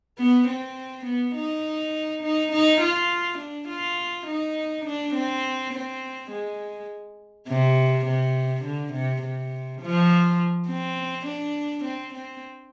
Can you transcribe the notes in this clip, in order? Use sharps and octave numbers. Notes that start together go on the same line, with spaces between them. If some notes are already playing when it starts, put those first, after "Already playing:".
B3
C4
B3
D#4
D#4
D#4
F4
D4
F4
D#4
D4
C4
C4
G#3
C3
C3
D3
C3
C3
F3
C4
D4
C4
C4